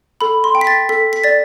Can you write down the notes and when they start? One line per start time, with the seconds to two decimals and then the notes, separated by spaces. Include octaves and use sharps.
0.21 A4 B5
0.44 C6
0.55 G5
0.61 B6
0.67 A6
0.89 A4 B6
1.13 B6
1.24 D5 A6